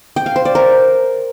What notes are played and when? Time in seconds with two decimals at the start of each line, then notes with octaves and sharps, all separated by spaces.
0.16 G5
0.26 F5
0.36 C5
0.45 D5
0.55 A#4